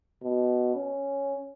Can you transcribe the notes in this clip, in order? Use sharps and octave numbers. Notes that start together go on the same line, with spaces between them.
B2
C#4